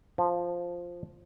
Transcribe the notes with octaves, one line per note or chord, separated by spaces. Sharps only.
F3